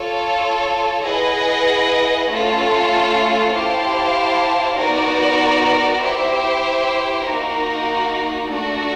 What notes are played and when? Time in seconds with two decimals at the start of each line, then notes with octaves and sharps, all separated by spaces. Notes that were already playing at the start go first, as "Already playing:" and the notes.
Already playing: F4 A4 C#5
1.04 E4 G#4 B4 D#5 F#5
2.29 A3 C#4 F4 A4
3.52 E4 G4 C5 F5 A5
4.77 B3 D#4 F#4 A#4 D5
6.01 E4 G4 C5 E5
7.25 A#3 D#4 F#4 A#4
8.49 A3 D4 F#4